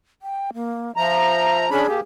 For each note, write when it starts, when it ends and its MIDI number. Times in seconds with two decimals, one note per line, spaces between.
0.22 0.51 79
0.54 0.96 58
0.97 1.70 53
0.97 1.65 76
0.97 1.70 82
1.70 1.87 61
1.70 1.87 62
1.70 1.99 68
1.70 1.87 83
1.88 2.01 58
1.88 2.01 67